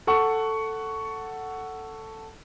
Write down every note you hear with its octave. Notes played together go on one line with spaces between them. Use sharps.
A4 F#5 C#6